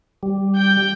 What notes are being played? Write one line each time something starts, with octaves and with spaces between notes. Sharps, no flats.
G3
G5 G6